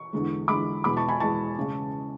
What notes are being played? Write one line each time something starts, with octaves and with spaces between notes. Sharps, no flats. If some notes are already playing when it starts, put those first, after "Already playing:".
Already playing: C#6
E2 D3 G#3
E2 D3 G#3 B5 D6
E2 B2 G#3 B5 D6
A5 C#6
G#5 B5
E2 B2 G#3 A5 C#6
C#3 G#3